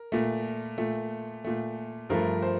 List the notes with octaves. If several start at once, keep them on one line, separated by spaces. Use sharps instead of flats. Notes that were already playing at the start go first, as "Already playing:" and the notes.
Already playing: A#4
A#2 A3
A#2 A3
A#2 A3
G2 F3 A3 A#4
C5